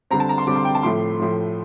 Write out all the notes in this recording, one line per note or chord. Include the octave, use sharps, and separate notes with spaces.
D3 G3 C4 A#5
A5
A#5
C6
D3 G3 C4 D6
C6
G5
A5
A2 F3 A3 C6
A2 F3 A3